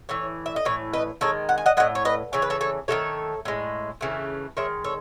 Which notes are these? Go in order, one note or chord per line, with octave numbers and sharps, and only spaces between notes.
A2 E3 C#5
E5
D#5
A2 E3 C#5
B4 D#5
D#3 G#3 A4 C#5
F#5
G#5
D#5 F#5
A2 G#3 D#5 F#5
C#5
B4 D#5
C#3 E3 C#5
B4
A4 C#5
A4 C#5
D#3 F#3 A3 A4 C#5
A2 G#3
C#3 E3 A3
D#3 G#3 C#5 E5
A4 C#5